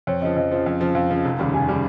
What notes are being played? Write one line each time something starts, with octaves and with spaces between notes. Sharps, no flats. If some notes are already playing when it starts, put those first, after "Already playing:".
F2 C#5
C#3 F3 D#5
F2 D#5
C#3 F3
F2
C#3 F3
F2 F5
C#3 F3
F1
D#2 C#3 G3
F1 G#5
C#3 G3